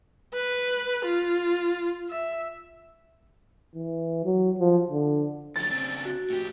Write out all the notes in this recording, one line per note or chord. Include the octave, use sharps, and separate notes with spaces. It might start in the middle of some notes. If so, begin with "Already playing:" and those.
B4
F4
E5
E3
F#3
F3
D3
F2 D3 F#3 A6
C#3 C4 D4
F#4
A2 G4